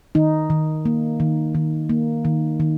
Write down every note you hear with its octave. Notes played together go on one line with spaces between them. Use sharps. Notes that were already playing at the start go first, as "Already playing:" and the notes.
D#3 D#4
D#3
A#3
D#3
D#3
A#3
D#3
D#3